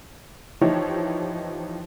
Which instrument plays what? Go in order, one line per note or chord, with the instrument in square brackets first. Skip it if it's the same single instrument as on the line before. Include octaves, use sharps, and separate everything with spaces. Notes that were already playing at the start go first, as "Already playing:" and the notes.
[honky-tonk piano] E3 F3 D#4 E4 G4 C#5